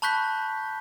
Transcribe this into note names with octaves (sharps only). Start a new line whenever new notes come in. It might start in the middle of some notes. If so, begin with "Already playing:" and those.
A5 B5 C#6 F#6 G6 B6